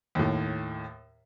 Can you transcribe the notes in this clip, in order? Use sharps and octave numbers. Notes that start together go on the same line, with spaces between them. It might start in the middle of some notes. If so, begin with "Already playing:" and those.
D#2 A2